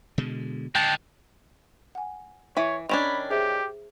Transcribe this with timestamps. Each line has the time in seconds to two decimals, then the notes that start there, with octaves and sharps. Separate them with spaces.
0.18 B2 D3 G#3
0.75 D3 G#3 G5 A5
1.95 F#5 G#5
2.57 E3 C#5 E5 B5
2.89 D#3 C#4 D4 B5 G#6 E7 F7
3.31 G4 G#4 C5 E5